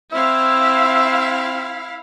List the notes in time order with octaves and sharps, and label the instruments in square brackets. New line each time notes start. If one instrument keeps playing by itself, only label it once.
[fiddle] C4 [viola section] E4 F5 [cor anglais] E5